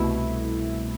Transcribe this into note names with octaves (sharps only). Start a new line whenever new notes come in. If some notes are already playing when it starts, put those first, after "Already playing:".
Already playing: C2 B2 A3 E4